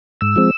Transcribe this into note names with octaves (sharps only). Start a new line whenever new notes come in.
G#2 E6
F3 G#3 C4